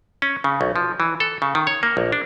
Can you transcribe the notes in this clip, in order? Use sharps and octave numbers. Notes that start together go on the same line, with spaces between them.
C#4
C#3
B1
F3
E3
A4
C#3
D#3
C#5
A#3
A#1
D4